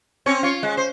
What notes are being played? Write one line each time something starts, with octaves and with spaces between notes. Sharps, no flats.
C4 C#4 C#5
F4 C#5
G#3
C5